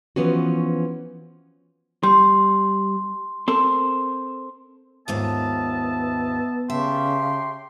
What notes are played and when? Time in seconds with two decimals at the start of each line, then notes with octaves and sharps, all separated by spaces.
0.16 E3 F3 B3 C#4 F#4
2.03 G3 C6
3.48 C4 A4 A#4 C6
5.08 D#2 G#2 B3 F4 D#5 E5 A5
6.70 C#3 G4 E5 A5 C6